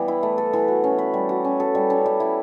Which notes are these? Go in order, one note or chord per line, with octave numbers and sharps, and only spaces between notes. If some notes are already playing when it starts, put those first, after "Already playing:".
Already playing: E3 G3 B3
E4
A3
A4
E3
F#4
C#4
B4
G3
F#4
C#4
A4
G3
C#4
G3
E4